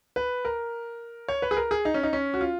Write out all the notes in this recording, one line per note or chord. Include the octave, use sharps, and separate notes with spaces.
B4
A#4
C#5
B4
G#4
A#4
G#4
D#4
C#4
D#4
C#4
F#4
F4